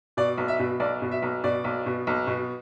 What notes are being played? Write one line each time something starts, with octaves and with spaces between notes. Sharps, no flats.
B2 D5
B1
E5
B2
B1 D5
B2
E5
B1
B2 D5
B1
B2
B1
B2